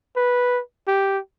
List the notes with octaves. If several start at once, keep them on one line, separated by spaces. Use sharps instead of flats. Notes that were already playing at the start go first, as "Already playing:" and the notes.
B4
G4